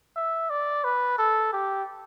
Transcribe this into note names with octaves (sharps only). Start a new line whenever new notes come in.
E5
D5
B4
A4
G4